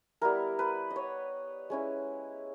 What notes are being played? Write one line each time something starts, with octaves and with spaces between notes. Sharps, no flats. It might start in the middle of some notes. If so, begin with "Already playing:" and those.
G3 B3 E4 A#4
B4
D#5
C#5
G#3 C#4 E4